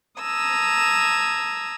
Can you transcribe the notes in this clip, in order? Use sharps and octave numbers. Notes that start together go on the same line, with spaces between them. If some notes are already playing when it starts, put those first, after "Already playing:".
A5 A#5 D#6 E6 G#6